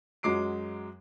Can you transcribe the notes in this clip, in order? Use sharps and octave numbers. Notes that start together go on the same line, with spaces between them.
F#2 F#3 G#3 D6 C7 D7